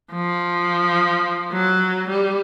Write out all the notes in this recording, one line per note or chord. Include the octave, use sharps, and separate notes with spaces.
F3
F#3
G3